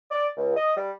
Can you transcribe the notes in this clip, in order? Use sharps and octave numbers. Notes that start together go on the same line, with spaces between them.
D5
C#2
D#5
G3